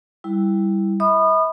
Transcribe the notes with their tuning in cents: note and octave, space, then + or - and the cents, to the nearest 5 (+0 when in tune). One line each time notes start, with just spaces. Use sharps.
G3 +0 E4 +0
E5 -45 B5 +0 D#6 -30